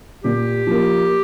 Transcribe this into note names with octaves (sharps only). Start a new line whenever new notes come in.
A#2 G4
F3 A#3